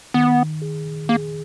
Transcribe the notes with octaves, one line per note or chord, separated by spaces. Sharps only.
D#3 B3
G#4
A#3 G#4